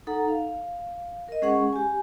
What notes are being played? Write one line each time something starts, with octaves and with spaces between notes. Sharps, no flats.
D#4 A4 F#5 A#5
F5
A#4 D#5
G#3 C#4 G#4 F#5 C#6
G4 G#5